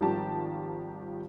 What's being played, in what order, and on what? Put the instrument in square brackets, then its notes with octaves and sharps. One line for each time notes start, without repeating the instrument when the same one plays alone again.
[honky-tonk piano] G#1 D#3 F3 G3 G4 A5